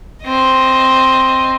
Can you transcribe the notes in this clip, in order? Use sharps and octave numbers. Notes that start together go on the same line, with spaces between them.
C4 D#5